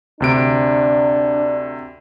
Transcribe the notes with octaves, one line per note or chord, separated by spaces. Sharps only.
D2 C3 D4 D7